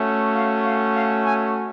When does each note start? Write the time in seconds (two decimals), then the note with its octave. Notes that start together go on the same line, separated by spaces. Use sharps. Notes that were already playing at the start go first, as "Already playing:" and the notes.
Already playing: A3 C#4 F#4
0.34 F5
0.64 F5
0.95 F5
1.25 G#5